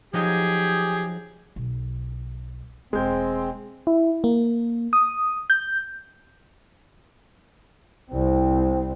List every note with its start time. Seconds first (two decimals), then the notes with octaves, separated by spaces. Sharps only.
0.14 F3 F#3 D#4 G4 G#4
1.56 B1
2.93 E1 G#3 C4 G6
3.87 E4
4.24 A#3
4.93 D#6
5.50 G6
8.11 C2 C4